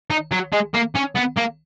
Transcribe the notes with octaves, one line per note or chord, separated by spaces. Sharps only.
D#4
F#3
G#3
A#3
C#4
B3
A#3